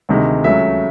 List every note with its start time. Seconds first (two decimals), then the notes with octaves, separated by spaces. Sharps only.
0.09 D2 C3 D#3 G#3
0.44 C#2 C#3 F#3 A3 E5